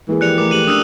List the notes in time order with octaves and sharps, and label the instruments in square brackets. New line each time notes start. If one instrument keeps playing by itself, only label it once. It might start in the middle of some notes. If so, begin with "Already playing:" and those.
[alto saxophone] E3 [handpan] G#3 A#3 G#4
[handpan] F3 G4 D5 [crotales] F#6 C#7 F7
[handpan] A3 A#4 [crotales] D6
[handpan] A3 E4 G4 [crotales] D#7 F#7
[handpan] C#4 D4 [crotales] D#6 E6 F#6